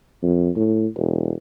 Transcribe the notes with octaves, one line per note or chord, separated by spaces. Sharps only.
F2
A2
E1